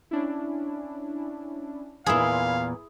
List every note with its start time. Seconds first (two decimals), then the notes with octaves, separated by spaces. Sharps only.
0.11 C#4 D4 E4
2.06 E2 A#2 E4 G#4 F5 B5 C6 G#6